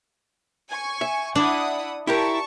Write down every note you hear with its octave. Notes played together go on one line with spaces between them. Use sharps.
G#5 C#6
E5
D4 E4 F#5 D#6
E4 G4 A#4 A5 C#6